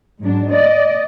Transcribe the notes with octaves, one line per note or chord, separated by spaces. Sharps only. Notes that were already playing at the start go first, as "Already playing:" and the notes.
G#2 F#3 D4
D5 D#5